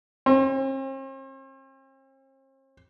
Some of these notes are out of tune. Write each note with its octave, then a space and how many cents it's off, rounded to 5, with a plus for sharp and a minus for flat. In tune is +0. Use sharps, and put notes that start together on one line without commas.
C4 +45